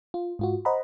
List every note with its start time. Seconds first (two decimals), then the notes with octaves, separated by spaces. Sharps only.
0.14 F4
0.39 G#2 F4 F#4
0.65 C5 D#5 F#5 A#5 B5